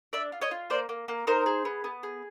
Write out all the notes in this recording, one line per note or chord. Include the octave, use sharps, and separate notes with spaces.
D4 D5 E5
F4
C#5 D#5
F4
A#3 C5 D5
A#3
A#3
D#4 A#4 C5
G#4
B3
B3
G#4